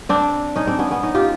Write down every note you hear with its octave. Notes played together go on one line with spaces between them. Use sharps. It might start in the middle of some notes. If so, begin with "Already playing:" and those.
C4 D4
C#4 D#4
C4 D4
B3 C#4
B3 C#4
C#4 D#4
F4 G4